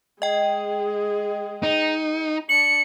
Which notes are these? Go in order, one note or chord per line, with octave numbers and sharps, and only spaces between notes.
G#3 G#4 D#5 G5
D#4
D4 C#7 F#7